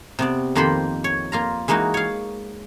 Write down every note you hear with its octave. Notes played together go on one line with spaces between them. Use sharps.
C3 B3 D5
F2 D#3 A#3 G4 C5 B5
C#5
A#3 F4 A#5
E3 G#3 A#3 D#4 F#4
C#5 F5